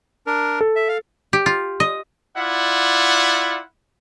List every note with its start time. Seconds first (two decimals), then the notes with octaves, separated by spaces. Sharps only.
0.27 D4 A#4
0.61 A4
0.76 E5
0.88 F5
1.33 G4
1.46 F4
1.80 D#5
2.37 E4 F4 D5 F#5